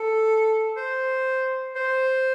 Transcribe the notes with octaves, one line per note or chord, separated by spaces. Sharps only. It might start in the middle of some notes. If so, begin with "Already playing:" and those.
Already playing: A4
C5
C5